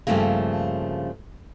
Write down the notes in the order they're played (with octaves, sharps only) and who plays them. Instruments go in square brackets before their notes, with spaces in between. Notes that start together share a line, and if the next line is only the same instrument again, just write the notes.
[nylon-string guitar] G2 C#3 F3 A3 A#3